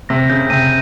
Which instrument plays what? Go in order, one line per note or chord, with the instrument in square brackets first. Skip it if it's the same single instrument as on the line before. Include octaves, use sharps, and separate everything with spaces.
[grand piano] C3 [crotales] A#6
[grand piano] C#3 [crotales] G6
[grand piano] C3 [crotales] D#7